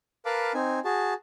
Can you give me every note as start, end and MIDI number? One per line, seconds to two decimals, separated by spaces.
0.25 0.53 70
0.25 0.53 71
0.25 0.53 77
0.25 0.53 81
0.25 0.53 83
0.25 0.53 86
0.54 0.79 60
0.54 0.79 63
0.54 0.79 80
0.85 1.14 66
0.85 1.14 68
0.85 1.14 81